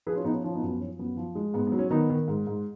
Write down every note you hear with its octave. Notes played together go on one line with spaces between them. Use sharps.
F3 G#4 B4
C#4 F4
F3 B3 D#4
C#4
F3 C#4
B3 D#4
F#2
B3
F3 C#4
F#2 B3
F3
G#3
G#2 B3
B3
F#3
C#4
D#3 B3 D#4
D#3
G#2
G#2